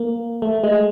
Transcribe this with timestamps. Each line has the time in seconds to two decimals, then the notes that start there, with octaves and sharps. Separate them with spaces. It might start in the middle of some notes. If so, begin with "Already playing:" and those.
Already playing: A#3
0.42 A3
0.64 G#3